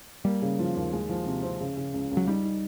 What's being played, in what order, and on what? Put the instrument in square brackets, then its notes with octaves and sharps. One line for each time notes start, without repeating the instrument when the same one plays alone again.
[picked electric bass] G3 [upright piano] A#3
[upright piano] C#3
F3
D#2
G#3
F3
C3
C4
C#3
C#3
C#2
C#2
[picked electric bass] F#3
[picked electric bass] G3 [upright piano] D#4
[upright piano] D#4